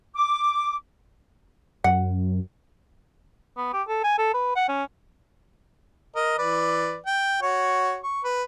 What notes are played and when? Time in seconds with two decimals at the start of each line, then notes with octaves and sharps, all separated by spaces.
0.15 D6
1.84 F#2 F#5
3.57 B3
3.73 G4
3.88 A4
4.04 G#5
4.18 A4
4.34 B4
4.56 F#5
4.69 C#4
6.16 A#4 D#5
6.38 E3 B4 D5
7.06 G5
7.42 F#4 C#5
8.04 C#6
8.25 B4